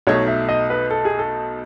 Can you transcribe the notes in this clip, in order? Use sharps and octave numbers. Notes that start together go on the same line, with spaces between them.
B1 B2 A3 D#4 C#5
E5
D#5
B4
A4
G#4
A4